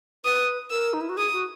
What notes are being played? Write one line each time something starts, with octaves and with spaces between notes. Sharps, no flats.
B4 D#6
A#4 E6
D#4
E4
F#4
G#4 D#6
F#4